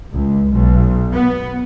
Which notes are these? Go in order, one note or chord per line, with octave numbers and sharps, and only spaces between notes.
C#2
B1
B3